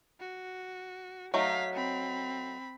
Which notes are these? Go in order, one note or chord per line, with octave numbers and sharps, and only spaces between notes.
F#4
F#3 A3 D#4 F5 B6
C4 B5